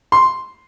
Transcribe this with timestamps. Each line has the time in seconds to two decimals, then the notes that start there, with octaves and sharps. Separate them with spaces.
0.12 C6